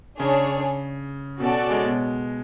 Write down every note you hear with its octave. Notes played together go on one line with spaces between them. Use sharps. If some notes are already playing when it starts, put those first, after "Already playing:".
C#3 D4 G#4 C#5
B2 C#4 F#4 A4 D5
G#3
B2